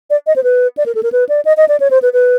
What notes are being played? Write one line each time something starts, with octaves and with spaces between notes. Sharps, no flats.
D5
D#5
C5
B4
D5
A#4
A4
A#4
B4
D5
D#5
D#5
D5
C#5
C5
B4
B4